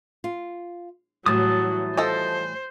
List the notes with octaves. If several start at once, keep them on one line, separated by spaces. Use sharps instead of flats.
F4
A2 E3 F#3 G3 A5 D#6
F3 A4 C5 D#5